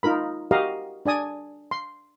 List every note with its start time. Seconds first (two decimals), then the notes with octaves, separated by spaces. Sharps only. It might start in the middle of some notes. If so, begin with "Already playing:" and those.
0.03 D#4 F4 A#4 B5
0.51 F#4 G4 A#4 D#5 F5
1.06 D4 D5 G#5 D#6
1.71 C6